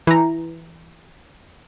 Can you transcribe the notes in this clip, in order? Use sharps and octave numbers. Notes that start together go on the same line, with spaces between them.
E3 A#5